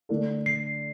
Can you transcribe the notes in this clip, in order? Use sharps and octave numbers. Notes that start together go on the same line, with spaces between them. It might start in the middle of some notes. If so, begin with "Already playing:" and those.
D3 A3 D4 A4
C7